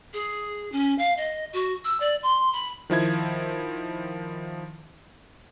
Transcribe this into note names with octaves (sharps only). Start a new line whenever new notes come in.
G#4
C#4
F5
D#5
F#4
E6
D5
C6
B5
D#3 F3 E4 G#6